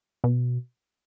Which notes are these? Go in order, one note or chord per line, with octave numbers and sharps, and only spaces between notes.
B2